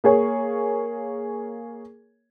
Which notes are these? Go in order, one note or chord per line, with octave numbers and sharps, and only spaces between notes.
A#3 G#4 C#5